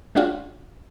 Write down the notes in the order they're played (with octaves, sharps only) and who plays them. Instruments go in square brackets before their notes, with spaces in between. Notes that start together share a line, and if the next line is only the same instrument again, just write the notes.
[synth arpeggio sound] G#3 C#4 D4 F4 F#4